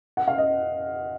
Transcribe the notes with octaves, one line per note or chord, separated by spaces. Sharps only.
F#5
F5
D#5